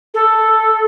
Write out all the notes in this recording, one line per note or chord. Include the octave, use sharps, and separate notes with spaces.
A4